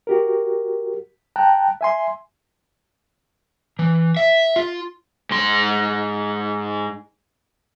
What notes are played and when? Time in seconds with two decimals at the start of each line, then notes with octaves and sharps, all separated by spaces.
0.07 F#4 G4 A#4
1.36 G5 A5 A#5 F#6
1.81 E5 G#5 C6
3.79 E3
4.17 E5
4.56 F4
5.31 G#2 C6